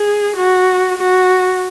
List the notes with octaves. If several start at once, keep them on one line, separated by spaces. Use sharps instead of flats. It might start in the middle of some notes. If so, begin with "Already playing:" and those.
Already playing: G#4
F#4
F#4